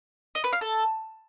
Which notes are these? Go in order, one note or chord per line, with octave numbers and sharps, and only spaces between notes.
D#5
B4
F5
A4